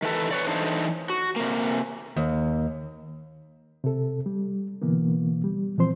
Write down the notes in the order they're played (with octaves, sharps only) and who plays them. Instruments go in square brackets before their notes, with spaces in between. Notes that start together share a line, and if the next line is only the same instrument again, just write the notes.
[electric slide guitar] D#3 E3 F#3 A4 B4
B4 C#5 D5
E3 D4 D#4 A4 C5 C#5
F#4
C3 A#3
[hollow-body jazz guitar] D#2
[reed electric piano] C3 A4
G3
B2 D3 E3 A#3 B3
G3
A#2 E3 F3 C4 C5 C6